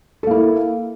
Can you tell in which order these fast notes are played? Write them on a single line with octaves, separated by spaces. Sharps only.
A4 A#3 E4